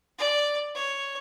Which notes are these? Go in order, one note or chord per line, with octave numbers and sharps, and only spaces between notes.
D5
C#5